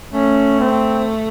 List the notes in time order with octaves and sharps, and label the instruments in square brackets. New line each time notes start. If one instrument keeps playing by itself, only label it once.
[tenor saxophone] A3 [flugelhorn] C#4
[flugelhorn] C4